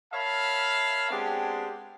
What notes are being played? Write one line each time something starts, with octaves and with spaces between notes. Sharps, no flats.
A#4 C#5 E5 F5 A5 B5
G#3 B3 C4 D4 G4